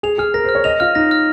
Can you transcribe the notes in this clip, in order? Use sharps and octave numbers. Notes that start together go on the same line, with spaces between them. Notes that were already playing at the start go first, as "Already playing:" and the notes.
G#4 F7
G#4 F6
A#4 A#6
C5
F6
C#5
D#5 F7
F4 F6
D#4 A#6
F6